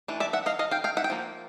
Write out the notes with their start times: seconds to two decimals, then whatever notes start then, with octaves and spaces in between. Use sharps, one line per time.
0.08 E3 A3 D4
0.20 D5 E5
0.33 E5 F#5
0.46 D#5 F5
0.59 D#5 F5
0.71 F5 G5
0.84 F5 G5
0.97 E5 F#5
1.04 G5
1.10 F3 A#3